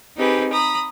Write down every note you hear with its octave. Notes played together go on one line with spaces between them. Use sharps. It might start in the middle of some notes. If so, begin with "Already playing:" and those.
C4 D#4 G4 G#4 B4
A#5 B5 D#6